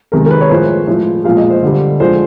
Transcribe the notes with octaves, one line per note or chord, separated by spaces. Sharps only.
C3 D#3 G#3 A#4
A#4
B4
C#5
A2 F3 G#3 C5
A2 F3 G#3
A#2 F3 G#3 F5
D#5
C5
D3 G3
D3 F3 G#3 C5